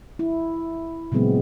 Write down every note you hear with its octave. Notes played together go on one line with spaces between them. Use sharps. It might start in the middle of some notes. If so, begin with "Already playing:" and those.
E4
A#2 C#3 F#3 G#3 B3 C4